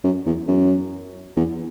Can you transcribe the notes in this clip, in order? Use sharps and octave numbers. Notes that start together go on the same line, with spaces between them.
F#2
E2
F#2
E2